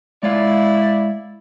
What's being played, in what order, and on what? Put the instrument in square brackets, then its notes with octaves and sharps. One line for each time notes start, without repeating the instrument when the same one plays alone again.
[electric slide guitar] G#3 C#5 F5 [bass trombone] E4 [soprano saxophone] D5